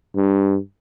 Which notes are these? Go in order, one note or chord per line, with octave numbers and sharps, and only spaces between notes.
G2